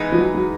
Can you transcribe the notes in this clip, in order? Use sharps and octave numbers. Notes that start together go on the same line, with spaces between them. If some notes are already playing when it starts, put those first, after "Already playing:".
Already playing: E3 G#3 B3 D#4
F3
F#3
F#3